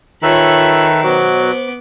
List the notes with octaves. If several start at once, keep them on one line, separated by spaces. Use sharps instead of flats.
D#3 F4 A4 B4 C#5 E5 B5
B2 F#3 B3 F#4 C5 D6